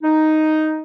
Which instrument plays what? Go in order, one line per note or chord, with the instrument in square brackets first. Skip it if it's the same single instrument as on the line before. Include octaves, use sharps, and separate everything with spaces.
[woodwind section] D#4